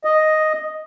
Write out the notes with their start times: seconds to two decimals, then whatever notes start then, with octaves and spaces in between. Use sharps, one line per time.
0.05 D#5